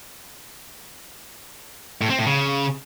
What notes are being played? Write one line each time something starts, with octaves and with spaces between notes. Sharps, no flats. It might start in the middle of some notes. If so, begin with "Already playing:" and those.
A2
C4
A2
C#3